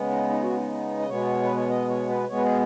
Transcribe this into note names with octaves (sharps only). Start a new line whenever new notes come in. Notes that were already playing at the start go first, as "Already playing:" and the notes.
Already playing: C#3 G#3 B3
D#4
D#4
F#4
D#4
D#5
B2 G#3 B3 C#5
B4
C#5
D#5
C#5
B4
B2 G#3 B3 C#5
B4
G#4